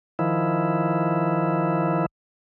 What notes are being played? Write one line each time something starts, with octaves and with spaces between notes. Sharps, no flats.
D#3 F3 E4